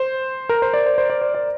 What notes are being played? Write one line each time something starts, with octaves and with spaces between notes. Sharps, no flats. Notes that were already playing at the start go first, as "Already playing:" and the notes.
Already playing: C5
A#4
C5
D5
C5
C5
D5
C5
D5